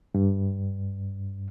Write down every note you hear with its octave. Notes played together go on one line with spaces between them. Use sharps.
G2